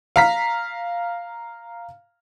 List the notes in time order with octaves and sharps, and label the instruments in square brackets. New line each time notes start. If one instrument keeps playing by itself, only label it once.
[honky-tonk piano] F5 A#5 B6